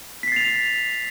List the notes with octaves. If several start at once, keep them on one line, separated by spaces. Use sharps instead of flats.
A6 B6 C7 F7